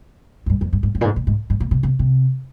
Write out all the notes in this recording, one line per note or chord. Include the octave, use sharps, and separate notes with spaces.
F2
G2
F2
G2
G#2
G2
A#2
G#2
A#2
G#2
G#2
A#2
C3
C3
C3